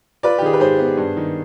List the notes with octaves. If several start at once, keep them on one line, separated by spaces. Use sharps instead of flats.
F4 B4 D5
G4
D#3 G#4
B4
G#2 G#4 C5
B3
G2
D#3